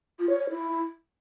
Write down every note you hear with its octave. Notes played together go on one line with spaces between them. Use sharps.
F4
C#5
C#5
E4